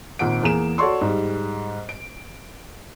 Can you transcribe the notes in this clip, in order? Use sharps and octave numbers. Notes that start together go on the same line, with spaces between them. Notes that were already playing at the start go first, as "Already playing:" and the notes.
G#1 A#2 F#5 D7
E2 A#3 G#4 E7
F#4 A4 C#5 D5 C6 C#6
G#2 G3
D7